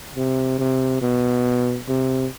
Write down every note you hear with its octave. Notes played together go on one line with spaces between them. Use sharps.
C3
C3
B2
C3